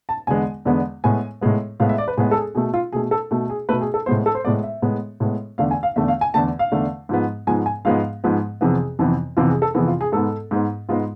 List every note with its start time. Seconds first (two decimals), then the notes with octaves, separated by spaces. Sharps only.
0.09 A5
0.27 E2 D3 G#3 B3 G#5
0.65 E2 D3 G#3 B3
1.04 A2 G#3 B3 G#5
1.41 A2 G#3 B3
1.80 A2 G#3 B3 F5
1.89 E5
1.98 D5
2.08 B4
2.17 A2 G#3 B3 G#4
2.31 A4
2.36 G#4
2.55 B2 A3 G#4
2.74 F4
2.92 B2 A3 G#4
3.11 A4
3.31 B2 A3
3.49 G#4
3.69 B2 A3 B4
3.81 G#4
3.94 A4
4.06 A2 G#3 B3 C5
4.26 A4
4.35 C5
4.45 A2 G#3 B3 D5
4.63 E5
4.82 A2 G#3 B3
5.20 A2 G#3 B3
5.58 E2 D3 A3 F5
5.71 G#5
5.83 F5
5.96 E2 D3 A3 E5
6.08 F5
6.21 G#5
6.34 E2 D3 A3 A5
6.59 F5
6.72 E2 D3 A3
7.09 G#2 F3 G#3 B3
7.47 G#2 F3 G#3 B3 G#5
7.66 G#5
7.85 G#2 F3 G#3 B3 F5
8.24 G#2 F3 G#3 B3
8.61 F2 C3 E3 B3 G#4
8.99 F2 C3 E3 B3
9.37 F2 C3 E3 B3 F4
9.49 G#4
9.62 A4
9.74 F2 C3 E3 B3 G#4
9.88 F4
10.01 G#4
10.12 G#2 G#3 B3 A4
10.51 G#2 G#3 B3
10.89 G#2 G#3 B3 F4